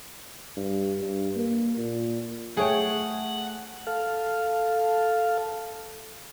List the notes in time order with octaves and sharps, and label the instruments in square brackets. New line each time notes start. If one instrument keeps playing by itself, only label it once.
[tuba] G2
G2
A#3
A#2
[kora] A3 C#5 G5 [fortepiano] G#4 [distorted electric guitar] F#5
[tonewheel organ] A4 F5